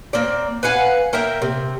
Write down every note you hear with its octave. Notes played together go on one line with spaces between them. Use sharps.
A#3 C4 D5
B4 F5 F#5 G#5
A#3 A#4 E5 G5
C3